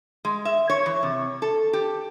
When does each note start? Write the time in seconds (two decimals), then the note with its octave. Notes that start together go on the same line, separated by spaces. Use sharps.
0.25 G#3
0.45 E5
0.70 C#5
0.86 E3
1.03 C3
1.42 A4
1.73 G4